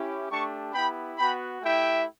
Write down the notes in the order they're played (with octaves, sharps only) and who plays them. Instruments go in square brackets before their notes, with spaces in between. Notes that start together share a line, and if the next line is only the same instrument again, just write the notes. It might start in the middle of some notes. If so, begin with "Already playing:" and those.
Already playing: [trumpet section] C#4 E4 G4
A3 D4 G4 A5 C#6
B3 E4 G4 G5 B5
B3 F#4 G5 B5
A3 E4 G4 E5 G5